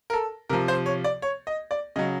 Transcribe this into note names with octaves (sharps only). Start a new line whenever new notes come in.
A#4
A4
C3 F3 A#4
C5
C#5
D5
C#5
D#5
D5
C#3 F#3 D#5